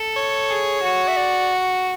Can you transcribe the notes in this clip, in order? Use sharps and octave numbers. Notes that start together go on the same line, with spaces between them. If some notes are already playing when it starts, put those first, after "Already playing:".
Already playing: A4
C#5
G#4
F#4
E5
D5